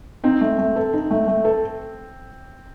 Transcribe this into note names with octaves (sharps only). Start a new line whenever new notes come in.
C4 D#4
A3
A3
A4
D#4
A3
A3
A4